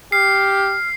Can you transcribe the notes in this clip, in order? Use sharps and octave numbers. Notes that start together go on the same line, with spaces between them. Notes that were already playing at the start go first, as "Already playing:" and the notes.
G4 F6 C7